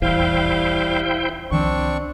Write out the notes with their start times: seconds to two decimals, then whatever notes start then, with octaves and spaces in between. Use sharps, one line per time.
0.02 D#1 A1 E2 G3 E4 C5 F5 G5
1.51 C2 D#3 F3 C4 D4 C#6